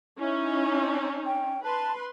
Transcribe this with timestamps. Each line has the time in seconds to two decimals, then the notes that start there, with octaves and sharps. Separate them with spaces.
0.19 C#4 D#4 E4
1.26 G5
1.64 B4 A5 C6